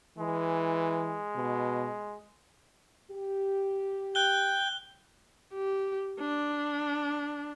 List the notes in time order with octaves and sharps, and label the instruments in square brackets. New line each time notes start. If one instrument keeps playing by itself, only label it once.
[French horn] E3 [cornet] G#3
[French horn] B2
[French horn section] G4
[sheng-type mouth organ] G5 [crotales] F#6 G7
[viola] G4
D4